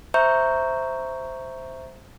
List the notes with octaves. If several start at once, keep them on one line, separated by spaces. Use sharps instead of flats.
C5 E5 A#5 C#6 G6